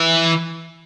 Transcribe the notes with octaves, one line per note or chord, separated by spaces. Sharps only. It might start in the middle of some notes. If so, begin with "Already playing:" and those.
Already playing: E3